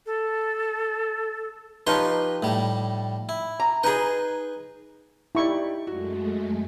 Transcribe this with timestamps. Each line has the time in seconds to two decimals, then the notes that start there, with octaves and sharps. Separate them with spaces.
0.06 A4
1.87 F3 D#4 G4 B4 C#5 C6
2.43 A2 G3
3.29 E4
3.60 A#5
3.84 D#4 G#4 B4 D#5 G#5
5.35 D#4 E4 G4 D5 C#6
5.87 F#2 G#3 A3 F#4